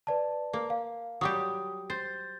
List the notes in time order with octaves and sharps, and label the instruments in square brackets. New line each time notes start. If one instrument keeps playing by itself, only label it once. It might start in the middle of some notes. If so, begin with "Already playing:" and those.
[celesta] B4 D5 A5
[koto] A#3
[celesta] F5
[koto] F#3 G3 G4 [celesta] D#6
[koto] C5 [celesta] G6 A6